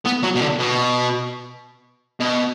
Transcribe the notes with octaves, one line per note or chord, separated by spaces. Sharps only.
B3
F#3
B2
D3
B2
B2